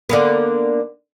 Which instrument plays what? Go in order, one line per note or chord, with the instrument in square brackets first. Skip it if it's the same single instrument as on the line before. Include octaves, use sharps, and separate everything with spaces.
[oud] D3 A#3 B3